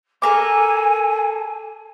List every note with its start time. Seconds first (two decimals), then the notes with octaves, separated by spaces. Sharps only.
0.22 A4 A#4 G#5 D6